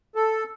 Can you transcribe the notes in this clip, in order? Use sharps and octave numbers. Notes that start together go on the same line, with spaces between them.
A4